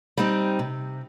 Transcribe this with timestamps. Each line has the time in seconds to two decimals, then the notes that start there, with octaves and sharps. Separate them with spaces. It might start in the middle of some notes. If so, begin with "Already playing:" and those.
0.17 G3 C4 D#4
0.59 C3